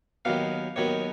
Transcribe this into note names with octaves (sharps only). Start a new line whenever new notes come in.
D#2 D#3 F#3 B3 F5
D#2 D#3 F#3 B3 C#5